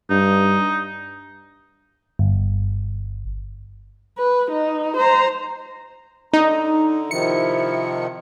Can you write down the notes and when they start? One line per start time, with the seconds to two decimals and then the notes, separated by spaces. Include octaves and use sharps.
0.10 G2 D#4
2.19 G1
4.18 B4
4.51 D#4
4.97 C5 A#5
6.33 D3 D#4 A#5
7.11 C3 D#3 F3 E4 C#7